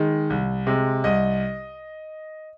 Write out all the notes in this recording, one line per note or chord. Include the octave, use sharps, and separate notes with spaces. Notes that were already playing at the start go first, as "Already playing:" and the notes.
Already playing: D#3 G#3
C2
C3 G#3
C2 D#5